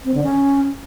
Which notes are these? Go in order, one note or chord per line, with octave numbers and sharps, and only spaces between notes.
C4
D3
C#4